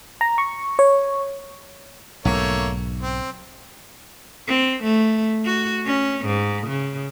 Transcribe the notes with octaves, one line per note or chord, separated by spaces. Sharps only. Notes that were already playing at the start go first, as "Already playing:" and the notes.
A#5
C#6
C#5
B1 G#2 A3 A#3 C#5
C4
C4
A3
F#4
C#4
G#2
C#3